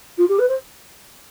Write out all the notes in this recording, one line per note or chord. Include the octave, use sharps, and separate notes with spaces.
F4
G4
B4
C5